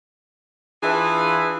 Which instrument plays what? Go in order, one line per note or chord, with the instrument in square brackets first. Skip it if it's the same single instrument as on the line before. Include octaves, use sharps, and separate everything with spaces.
[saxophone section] E3 D4 E4 F4 G#4 B4